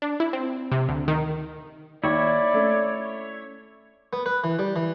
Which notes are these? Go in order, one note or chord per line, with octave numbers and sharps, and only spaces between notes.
D4
E4
C4
C3
D2
D#3
D#2 E4 C#5 D5
A3 C#4
B3
B4
E3
G3
E3